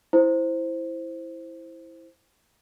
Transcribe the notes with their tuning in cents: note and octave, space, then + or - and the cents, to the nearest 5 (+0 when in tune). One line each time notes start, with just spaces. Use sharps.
E4 +0 C5 +0